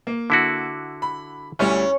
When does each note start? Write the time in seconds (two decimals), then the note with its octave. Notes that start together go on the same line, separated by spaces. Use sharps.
0.07 A#3
0.30 D3 E4 F#4
1.02 B5
1.59 D2 G3 C#4 E4